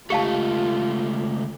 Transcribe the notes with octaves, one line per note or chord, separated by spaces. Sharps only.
C#2 A3 F4 G4 F5 A5